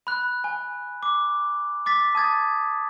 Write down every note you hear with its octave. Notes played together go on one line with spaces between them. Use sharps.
B5 F#6
G#5
D6
D6 A6 B6
A5 D#6 G#6 A6